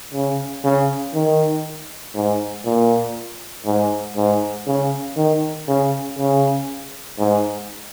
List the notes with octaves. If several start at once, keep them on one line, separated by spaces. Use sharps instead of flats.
C#3
C#3
D#3
G#2
A#2
G#2
G#2
C#3
D#3
C#3
C#3
G#2